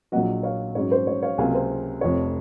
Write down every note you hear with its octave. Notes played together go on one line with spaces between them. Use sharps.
A#1 A#2 F#3 D#5 F#5
C#5 F5
G#2 F#3 C#4 C#5
C5
C#5
C#5 F5
C#2 C3 F#3 A#3 F5 G#5
C5
F1 F2 C3 F3 C#5